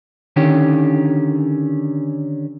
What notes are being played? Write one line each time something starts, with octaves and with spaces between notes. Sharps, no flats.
D3 D#3 C#4 G4